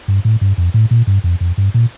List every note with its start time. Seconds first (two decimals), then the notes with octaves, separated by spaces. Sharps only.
0.08 G2
0.25 A2
0.41 G2
0.58 F2
0.74 A2
0.91 A#2
1.07 G2
1.24 F2
1.41 F2
1.58 G2
1.74 A#2